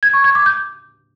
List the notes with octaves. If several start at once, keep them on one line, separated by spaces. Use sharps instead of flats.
G#6
C#6
G#6
D6
G6